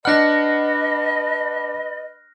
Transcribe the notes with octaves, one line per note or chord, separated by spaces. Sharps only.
D4 B4 D#5 F#5 F6 F#6 A#6